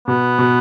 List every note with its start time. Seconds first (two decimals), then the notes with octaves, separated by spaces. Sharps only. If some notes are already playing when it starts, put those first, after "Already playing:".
0.08 B2 B3
0.38 B2